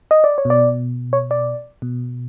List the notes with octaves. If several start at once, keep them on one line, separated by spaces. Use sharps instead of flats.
D#5
D5
C#5
B2
D5
C#5
D5
B2